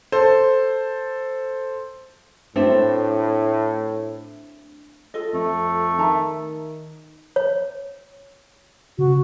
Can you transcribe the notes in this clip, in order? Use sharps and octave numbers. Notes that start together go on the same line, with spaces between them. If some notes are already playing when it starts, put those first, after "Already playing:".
A4 C5
A2 A3 C4 D4 F#4 C5 E5
F4 A4 D#5
F2 A3
D#3 E5 A5 A#5
C#5
C#3 F#4